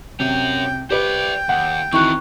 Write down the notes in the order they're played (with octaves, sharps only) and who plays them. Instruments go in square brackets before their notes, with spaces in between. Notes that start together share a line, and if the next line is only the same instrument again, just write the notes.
[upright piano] C3 [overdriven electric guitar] C#4 F#4 [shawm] G5
[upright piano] G4 B4 [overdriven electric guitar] C5 D5 [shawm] G5
[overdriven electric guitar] D#2 [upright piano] F#5
[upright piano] D#3 E3 [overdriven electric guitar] C4 F#4 [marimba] C#6 F#6